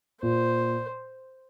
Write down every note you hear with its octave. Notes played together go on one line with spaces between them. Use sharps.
A#2 C5